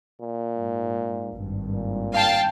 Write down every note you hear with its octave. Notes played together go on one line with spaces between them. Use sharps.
A#2
G#2
G#1 G2
A#2
F5 G5 A5